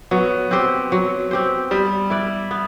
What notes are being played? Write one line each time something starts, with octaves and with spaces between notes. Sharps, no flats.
F#3 B3
C4 G4 C5
F#3
C4 G4 C5
G3 B3
E4 B4 D5
B3